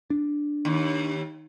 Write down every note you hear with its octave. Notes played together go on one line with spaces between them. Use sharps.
D4
D#2